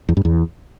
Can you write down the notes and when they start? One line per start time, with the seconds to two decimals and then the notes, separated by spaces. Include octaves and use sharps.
0.09 E2
0.17 G2
0.25 E2